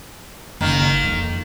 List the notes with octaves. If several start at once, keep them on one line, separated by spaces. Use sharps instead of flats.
F#1 D#3 A#3
F2